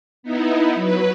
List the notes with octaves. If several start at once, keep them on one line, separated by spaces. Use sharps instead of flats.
B3 D#4 E4
F#3 B4